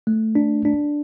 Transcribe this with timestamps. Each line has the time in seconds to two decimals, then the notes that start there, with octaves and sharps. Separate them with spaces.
0.07 A3
0.35 D4
0.65 D4